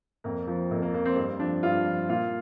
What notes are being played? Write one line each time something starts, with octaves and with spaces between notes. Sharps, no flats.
F2 A#3
F3
F2 A#3
A#3
F3 A#3
C4
G2 C4
F3 D4
G2 F4
F3
A#2 F4